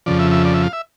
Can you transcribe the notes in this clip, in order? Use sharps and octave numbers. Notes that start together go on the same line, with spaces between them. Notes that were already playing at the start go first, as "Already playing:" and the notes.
F2 C#3 F3 D5
E5
E5
D5
E5
F5
E5